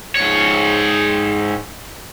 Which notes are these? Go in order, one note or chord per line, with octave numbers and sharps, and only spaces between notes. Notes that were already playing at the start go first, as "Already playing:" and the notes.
G#2 C#5